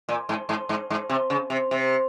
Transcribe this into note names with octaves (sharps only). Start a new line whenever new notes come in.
A#2
G#2
G#2
G#2
G#2
C3
C#3
C3
C3